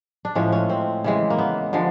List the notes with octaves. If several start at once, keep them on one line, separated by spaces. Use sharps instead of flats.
D4
A2 F3 G#3 C#4
C#4
C4
C#3 E3 G#3
A#3
B3
D3 F3 G#3